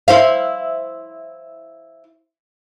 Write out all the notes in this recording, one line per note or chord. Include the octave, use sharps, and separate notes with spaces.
E4 C5 F5